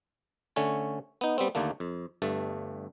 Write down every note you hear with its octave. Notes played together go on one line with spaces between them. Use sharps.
D3 A3 C#4 C#5
B3 D#4
G3 B3 C4
D#2 D3 A3 A#3
F2
G1 G2 A3 A5